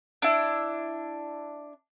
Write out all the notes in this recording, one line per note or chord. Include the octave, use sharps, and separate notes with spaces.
D4 E4